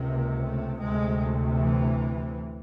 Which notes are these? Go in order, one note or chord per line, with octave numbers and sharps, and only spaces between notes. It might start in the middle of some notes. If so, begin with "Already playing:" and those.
Already playing: C#2 C3 A#3
A3
D2 C3 G#3
E3